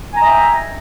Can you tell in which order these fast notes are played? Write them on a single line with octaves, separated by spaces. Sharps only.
G#5 A#5 D#5 E5 G5